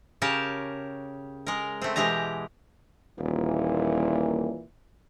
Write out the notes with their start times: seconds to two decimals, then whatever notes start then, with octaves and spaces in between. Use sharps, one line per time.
0.22 C#3 G4 A#4 C#5 A5
1.47 G#3 A#4
1.81 A3 C4
1.96 B2 E3 G#3 G4 A#5
3.19 D#1 A#2 E3